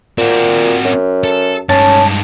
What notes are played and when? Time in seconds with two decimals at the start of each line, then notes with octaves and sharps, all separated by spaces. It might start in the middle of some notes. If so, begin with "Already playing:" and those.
0.18 A#2 C4 F#4
0.85 F#2
1.24 A4
1.69 G2 G#3 C#4 A5